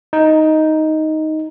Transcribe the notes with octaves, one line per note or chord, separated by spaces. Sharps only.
D#4